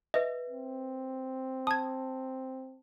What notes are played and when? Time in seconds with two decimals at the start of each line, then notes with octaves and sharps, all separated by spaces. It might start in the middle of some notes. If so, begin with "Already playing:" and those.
0.14 B4 D#5 E5
0.49 C4
1.67 A5 D#6 G#6